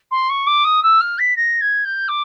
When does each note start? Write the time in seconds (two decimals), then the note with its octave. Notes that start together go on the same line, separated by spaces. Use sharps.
0.11 C6
0.29 C#6
0.46 D6
0.64 D#6
0.83 E6
1.00 F6
1.18 B6
1.36 A#6
1.61 G#6
1.84 G6
2.08 D6